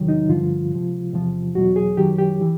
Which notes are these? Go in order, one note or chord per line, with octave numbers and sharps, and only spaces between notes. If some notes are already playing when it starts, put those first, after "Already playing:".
Already playing: E2 C3 D#3 F#3
D#4
G2 D3 F3 F4
C#2 C3 F3
E2 C3 F3
E2 B2 F#3 F#4
G#4
F#2 D#3 F#3 G4
G4
E3